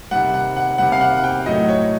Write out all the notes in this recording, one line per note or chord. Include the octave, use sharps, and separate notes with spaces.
C3 D#3 G3 F#5
F#5
F#5
C3 D#3 G3 F#5
F5
F#5
F#5
G5
A2 F#3 A3 D#5
C#5